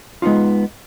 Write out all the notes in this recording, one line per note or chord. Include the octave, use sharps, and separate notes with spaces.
G#3 B3 C#4 D#4 F4